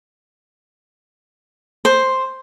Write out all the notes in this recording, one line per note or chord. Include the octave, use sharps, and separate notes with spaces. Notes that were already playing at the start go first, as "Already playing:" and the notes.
C5